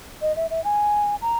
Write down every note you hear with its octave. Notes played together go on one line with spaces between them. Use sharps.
D#5
E5
E5
G#5
A#5